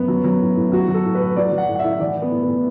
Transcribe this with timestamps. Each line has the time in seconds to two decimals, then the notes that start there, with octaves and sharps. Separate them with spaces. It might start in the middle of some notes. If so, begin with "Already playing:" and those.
Already playing: F#2 B3
0.08 F#3
0.24 F#3
0.41 A2
0.56 A2
0.72 F#3 F#4
0.88 F#3
0.94 A4
1.05 A2
1.15 B4
1.20 A2
1.36 F#3 D5
1.52 F#3
1.58 F#5
1.68 A2
1.75 F#5
1.79 A2 E5
1.99 E3 D5
2.16 E3
2.22 B3
2.31 A2
2.42 B3
2.48 A2